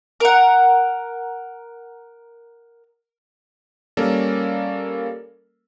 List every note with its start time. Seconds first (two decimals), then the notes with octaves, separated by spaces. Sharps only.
0.20 A#4 F#5
3.97 G3 A#3 C#4 A4 A#4 D5